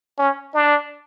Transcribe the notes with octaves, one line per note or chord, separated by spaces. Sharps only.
C#4
D4